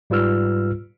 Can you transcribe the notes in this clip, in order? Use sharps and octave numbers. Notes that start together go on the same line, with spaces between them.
G#2 G3 F4 B4 E6 F6